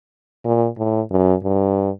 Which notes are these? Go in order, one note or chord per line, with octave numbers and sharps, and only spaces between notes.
A#2
A2
F#2
G2